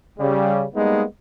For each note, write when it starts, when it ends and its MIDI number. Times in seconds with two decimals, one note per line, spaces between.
0.19 0.64 49
0.19 0.64 55
0.75 1.03 55
0.75 1.03 56
0.75 1.03 58
0.75 1.03 59
0.75 1.03 63